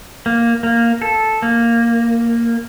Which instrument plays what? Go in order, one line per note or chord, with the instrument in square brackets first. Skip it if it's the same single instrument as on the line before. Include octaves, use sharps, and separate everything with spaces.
[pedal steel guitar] A#3
A#3
A4
A#3